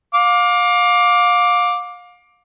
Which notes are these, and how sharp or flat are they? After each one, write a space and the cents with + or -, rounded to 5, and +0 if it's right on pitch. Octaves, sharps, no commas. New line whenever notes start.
F5 +30 D6 +0